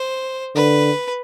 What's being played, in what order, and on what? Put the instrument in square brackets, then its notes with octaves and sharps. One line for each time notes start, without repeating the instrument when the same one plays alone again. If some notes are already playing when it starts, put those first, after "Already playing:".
Already playing: [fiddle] C5
[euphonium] D3 [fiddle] B4